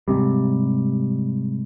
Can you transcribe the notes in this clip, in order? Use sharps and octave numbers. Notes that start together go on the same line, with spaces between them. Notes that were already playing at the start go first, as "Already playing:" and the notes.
G#2 C3 G3